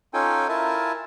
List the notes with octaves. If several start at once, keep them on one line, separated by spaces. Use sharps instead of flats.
C#4 D#4 F4 A4 G5 G#5
E4 F4 A#4 E5 G#5 A5